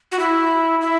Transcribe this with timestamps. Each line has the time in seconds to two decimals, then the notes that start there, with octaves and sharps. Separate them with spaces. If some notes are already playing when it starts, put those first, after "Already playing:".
0.12 F#4
0.19 E4
0.81 E4